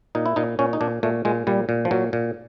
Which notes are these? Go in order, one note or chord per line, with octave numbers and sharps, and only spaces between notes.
A#2 D#4
E4
A#2 D#4
A#2 C#4
D#4
A#2 D4
A#2 A3
A#2 G#3
A#2 G3
A#2
F3
A#2 F#3
A#2